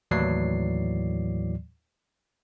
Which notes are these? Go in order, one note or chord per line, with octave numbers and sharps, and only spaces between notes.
D#2 A2 E3 F#3 D5 C7